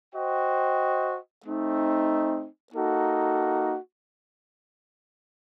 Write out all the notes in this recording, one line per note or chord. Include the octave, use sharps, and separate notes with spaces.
F#4 C5 D#5 G5
A3 C4 D#4
A#3 D#4 F#4 A4